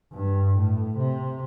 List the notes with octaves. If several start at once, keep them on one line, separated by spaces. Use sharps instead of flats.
G2
A2
C3